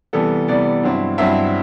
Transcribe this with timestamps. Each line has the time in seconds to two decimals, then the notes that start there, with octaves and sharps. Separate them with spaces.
0.13 C3 E3 G3 B3 A4
0.48 C3 E3 G3 B3 D5
0.83 G2 F#3 C4 E4
1.18 G2 F#3 C4 E4 E5